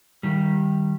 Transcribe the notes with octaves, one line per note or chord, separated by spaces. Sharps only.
D#3 G3